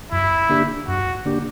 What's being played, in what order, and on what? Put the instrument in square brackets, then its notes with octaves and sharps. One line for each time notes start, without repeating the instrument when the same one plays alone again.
[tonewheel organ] F#2 [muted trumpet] E4
[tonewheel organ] D3 A#3 D4 G4
[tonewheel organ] F#2 [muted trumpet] F#4
[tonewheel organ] D3 A#3 D4 G4